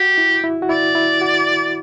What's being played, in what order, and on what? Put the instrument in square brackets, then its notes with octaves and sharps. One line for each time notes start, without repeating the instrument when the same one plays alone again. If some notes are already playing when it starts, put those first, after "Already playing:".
Already playing: [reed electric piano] F#4 [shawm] G4
[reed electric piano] E4
E4
F#4
[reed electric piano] E4 [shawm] D5
[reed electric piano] E4
F#4